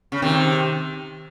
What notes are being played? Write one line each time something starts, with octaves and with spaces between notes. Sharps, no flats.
C#3
C3 D#3